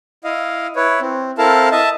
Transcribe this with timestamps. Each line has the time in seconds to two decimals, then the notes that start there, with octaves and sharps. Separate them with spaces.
0.24 E4 D#5 F5
0.76 E4 B4 C#5
1.01 C4
1.38 C4 E4 A4 A#4 F5 A5
1.72 D#5 E5 A5